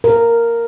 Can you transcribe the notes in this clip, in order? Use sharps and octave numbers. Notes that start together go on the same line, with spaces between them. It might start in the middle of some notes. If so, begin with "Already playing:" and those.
A#4